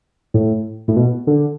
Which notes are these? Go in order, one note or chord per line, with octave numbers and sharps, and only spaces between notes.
A2
A2
B2
D3